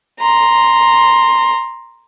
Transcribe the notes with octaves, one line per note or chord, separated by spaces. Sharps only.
A#5 C6